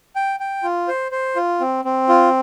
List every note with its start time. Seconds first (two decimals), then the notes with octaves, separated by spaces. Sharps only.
0.16 G5
0.40 G5
0.63 F4
0.88 C5
1.12 C5
1.36 F4
1.60 C4
1.85 C4
2.09 F4